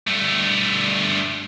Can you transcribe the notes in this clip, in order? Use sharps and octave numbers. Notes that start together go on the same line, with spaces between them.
G2 A3